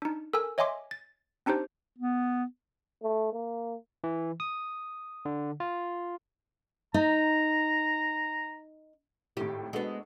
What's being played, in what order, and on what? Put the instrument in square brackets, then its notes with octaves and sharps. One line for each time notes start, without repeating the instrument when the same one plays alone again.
[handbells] D4 D#4
A4 A#4 G#5 E6
C#5 D#5 E5 G#5 C6 D6
A6
C4 D4 D#4 G4 C5
[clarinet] B3
[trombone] A3
A#3
[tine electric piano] E3
D#6
D3
F4
[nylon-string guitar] D#4 [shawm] A#5
[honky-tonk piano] G#1 A2 [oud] G4
[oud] G#3 B3 [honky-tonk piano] D4 F#4 A4